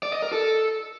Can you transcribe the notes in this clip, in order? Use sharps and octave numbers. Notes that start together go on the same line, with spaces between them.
D5
D#5
A#4
A4